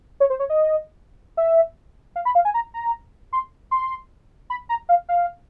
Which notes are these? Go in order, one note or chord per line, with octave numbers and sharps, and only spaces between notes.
C#5
C5
C#5
D#5
E5
F5
B5
F5
G#5
A#5
A#5
C6
C6
B5
A#5
F5
F5